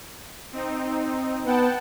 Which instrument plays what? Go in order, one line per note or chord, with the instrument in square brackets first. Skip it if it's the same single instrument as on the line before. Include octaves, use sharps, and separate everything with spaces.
[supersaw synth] C4 D#4
[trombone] B3 [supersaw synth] F#5 G5 A5